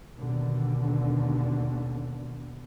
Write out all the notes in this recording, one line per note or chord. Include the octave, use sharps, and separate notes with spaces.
D#2 B2 D3